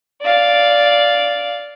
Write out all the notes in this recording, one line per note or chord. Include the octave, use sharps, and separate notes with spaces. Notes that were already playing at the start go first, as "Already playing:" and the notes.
D5 F5